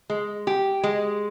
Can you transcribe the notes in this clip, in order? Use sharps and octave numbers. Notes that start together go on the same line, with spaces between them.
G#3
G4
G#3